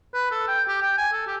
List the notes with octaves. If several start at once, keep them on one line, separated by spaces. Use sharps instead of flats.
B4
A4
G5
G4
G5
G#5
A4
G4